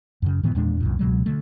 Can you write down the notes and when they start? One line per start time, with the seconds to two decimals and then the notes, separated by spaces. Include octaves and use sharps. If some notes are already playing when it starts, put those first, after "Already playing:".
0.22 F#2 C#3
0.43 A2 D#3 E3 B3
0.55 E2 A#2 G#3 D4
0.80 C2 F#2 A#2
0.99 C#2 B2 F#3 G#3
1.26 D3 A3